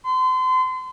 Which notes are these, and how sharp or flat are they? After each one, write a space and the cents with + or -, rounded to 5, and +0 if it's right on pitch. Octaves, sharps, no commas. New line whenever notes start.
C6 -35